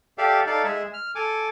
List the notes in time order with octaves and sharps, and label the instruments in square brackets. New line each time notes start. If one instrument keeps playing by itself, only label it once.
[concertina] G4 A4 D5 E5 F5
D#4 A4 D5 F5
G#3 G#4 E5
F6
A4 G#5 D6